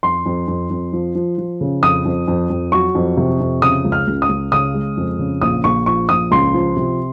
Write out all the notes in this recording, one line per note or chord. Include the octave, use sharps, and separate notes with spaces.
F2 C6
F2
F2
F2
F3
F3
F3
C#3
F2 D#6
F2
F2
F2
F#3 C#6
F2
C3
F2
C#3 D#6
C#2
F6
C#2
D#6
C#2
C#3 D#6
G#3
F2
C#3
A#1 D#6
A#1 C#6
F3 C#6
A#1 D#6
C#2 C6
F3
C3